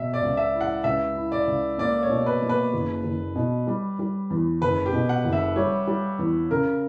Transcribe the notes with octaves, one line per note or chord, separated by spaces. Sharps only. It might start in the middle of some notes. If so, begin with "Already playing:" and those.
Already playing: B2 E5
D5
C#2
E5
E4
F#5
C#2 E5
E4
D5
C#2
A#3 D5
C#5
B2
B4
A#3
B4
F#1
F#1
B2
G3
G3
E2
F#1 B4
G4
B2
F#5
F#1
E5
G3 C#5
G3
E2
C#3 A#4